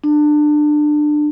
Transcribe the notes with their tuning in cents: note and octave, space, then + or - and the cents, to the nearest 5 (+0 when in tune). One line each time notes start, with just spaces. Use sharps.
D4 +25